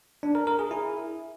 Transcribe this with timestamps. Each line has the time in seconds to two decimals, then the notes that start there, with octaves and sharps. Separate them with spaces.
0.23 D4
0.35 A#4
0.47 A#4
0.59 G#4
0.71 E4